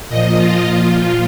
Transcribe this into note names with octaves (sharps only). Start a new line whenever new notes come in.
A#2 F3 D#5
F4
A#2 F3 F4
F4